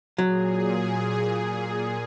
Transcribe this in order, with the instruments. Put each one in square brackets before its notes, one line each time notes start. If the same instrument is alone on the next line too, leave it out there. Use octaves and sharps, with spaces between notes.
[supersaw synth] A#2 G#4 [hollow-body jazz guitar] F#3